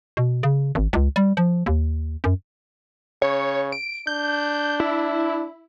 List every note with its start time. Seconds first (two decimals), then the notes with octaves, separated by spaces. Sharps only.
0.17 B2
0.43 C#3
0.75 G#1
0.93 C#2
1.16 G3
1.37 F3
1.66 D#2
2.24 F#2
3.22 C#3 C#5
3.72 D7
4.07 D4 G6
4.80 E4